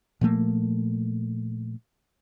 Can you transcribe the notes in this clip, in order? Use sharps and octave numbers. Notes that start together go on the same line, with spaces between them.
A#2 F3 A3 A#3